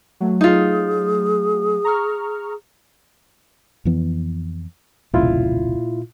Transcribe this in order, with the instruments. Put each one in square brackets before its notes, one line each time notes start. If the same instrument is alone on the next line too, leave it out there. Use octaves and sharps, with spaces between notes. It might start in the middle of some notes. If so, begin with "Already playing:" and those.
[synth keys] F#3 A3
[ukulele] D#4 F4 [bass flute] G#4
[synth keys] A#5 C#6 F6
[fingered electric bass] F2 E3 B3
[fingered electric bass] E1 C2 C#3 [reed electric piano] A#2 E4 F4